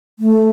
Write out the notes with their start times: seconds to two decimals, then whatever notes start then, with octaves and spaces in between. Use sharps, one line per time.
0.19 A3